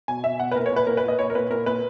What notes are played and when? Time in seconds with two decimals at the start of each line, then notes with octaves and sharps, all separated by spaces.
0.08 B2 G#5
0.24 B2 E5
0.40 B2 F#5
0.51 B4
0.56 A#2 A#4
0.66 C#5
0.72 A#2 B4
0.87 A#2 A#4
0.97 B4
1.03 A#2
1.08 D#5
1.19 A#2 C#5
1.30 A#4
1.35 A#2 B4
1.50 A#2 A#4
1.66 A#2 B4